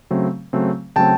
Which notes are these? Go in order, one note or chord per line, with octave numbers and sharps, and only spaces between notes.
C#3 F#3 A3 C4
C#3 F#3 A3 C4
C#3 F#3 A3 C4 G5 A5